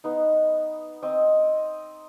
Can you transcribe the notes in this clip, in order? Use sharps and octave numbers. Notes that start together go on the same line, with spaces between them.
B3 D#4
C4 D#5